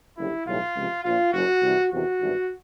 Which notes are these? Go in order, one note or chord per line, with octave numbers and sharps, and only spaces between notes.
F#1 F#2 D3 G3 E4
B1 A2 E3 G3 F4
C#2 C3 F3
A#1 A#2 F3 F4
F#1 F#2 C#3 F#4
C2 C3 E3 G3
E2 C3 D#3 F#4
G#1 G2 E3